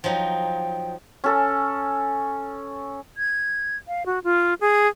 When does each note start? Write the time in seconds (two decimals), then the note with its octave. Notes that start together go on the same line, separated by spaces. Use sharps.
0.04 F3 F#3 D#4 G5
1.24 C#4 A4
3.18 G#6
3.88 F5
4.06 F#4
4.24 F4
4.61 G#4